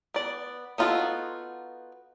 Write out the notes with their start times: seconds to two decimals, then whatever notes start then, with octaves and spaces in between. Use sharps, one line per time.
0.14 B3 D5
0.78 B3 D#4 F4 F#4 A4